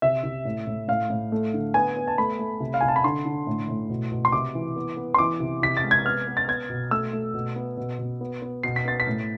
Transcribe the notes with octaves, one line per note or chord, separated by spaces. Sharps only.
C3 E5
C3
A2
A2
A2 F5
A2
A3
D3
B3 G#5
B3
A5
A3 B5
A3
C3
F5
C3 G#5
A5
B5
D3 C6
D3
A2
A2
B2
B2
C6
C3 D6
E3
B3
B3
C6
E3 D6
C3
C3 B6
A6
G#3
G#6
B3 F6
B3
A6
B3 G#6
B2
A3 E6
A3
B2
B3
B2
B2
B3
B3
B2 C7
B6
B3 A6
B6
A2